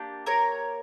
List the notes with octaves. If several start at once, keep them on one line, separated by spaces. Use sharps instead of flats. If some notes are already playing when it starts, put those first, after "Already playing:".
Already playing: A#3 D4 G4
A#4 C#5